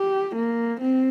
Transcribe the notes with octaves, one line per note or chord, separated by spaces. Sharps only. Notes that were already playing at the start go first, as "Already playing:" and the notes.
Already playing: G4
A#3
C4